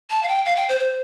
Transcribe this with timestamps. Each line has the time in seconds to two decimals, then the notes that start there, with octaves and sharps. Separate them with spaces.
0.10 A5
0.23 F5
0.28 G5
0.45 F5
0.56 G5
0.69 C5
0.80 C5